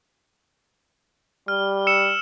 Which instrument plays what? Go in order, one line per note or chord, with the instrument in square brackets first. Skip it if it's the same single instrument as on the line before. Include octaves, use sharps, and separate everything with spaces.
[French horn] G3 [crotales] F6
[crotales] E6 C#7 E7